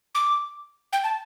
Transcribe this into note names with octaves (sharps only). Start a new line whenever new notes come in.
D6
G5
A5